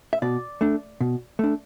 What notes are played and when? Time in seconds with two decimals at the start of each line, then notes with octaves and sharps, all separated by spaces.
0.13 E5
0.22 B2 D5
0.61 A3 D4
1.01 B2
1.39 A3 D4